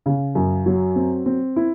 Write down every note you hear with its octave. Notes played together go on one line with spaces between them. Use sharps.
C#3
F#2
F#3
C4
C4
E4